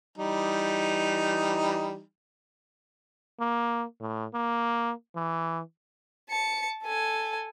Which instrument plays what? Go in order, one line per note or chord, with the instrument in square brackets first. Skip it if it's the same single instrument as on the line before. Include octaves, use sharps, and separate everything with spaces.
[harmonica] E3 G3 D#4
[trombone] A#3
A2
A#3
E3
[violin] A5 C#7
A4 G#5